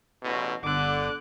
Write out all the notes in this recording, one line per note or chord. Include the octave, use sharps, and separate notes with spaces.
A1 E2 B2
G1 D3 D6 F#6